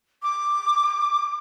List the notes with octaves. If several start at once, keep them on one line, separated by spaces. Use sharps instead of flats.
D6